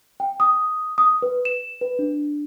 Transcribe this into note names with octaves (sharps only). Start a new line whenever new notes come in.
G5
D#6
D#6
B4
E7
B4
D4